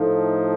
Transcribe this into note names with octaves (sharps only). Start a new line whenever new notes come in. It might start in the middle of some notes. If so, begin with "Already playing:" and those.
Already playing: A2 F3 A3 D#4